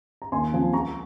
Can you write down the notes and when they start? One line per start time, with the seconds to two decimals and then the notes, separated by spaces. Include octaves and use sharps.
0.22 A#5
0.32 D#2 G#5 C6
0.52 C#3 F3 C4
0.72 C#2 A#5 C#6